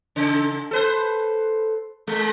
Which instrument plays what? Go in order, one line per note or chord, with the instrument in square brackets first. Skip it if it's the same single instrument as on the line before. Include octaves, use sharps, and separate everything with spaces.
[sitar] C#3
A4 B4 C5
G#3